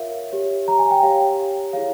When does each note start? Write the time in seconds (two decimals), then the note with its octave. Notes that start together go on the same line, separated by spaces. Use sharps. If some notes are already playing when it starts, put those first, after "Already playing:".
Already playing: F4 A#4 C#5 E5 F5
0.32 G4 C#5
0.68 A#5
0.79 G#5
0.91 G5
1.02 G4 C#5 F5
1.73 E4 G#4 C#5 F5